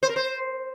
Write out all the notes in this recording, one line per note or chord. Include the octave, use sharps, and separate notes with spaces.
C5
A#4
C5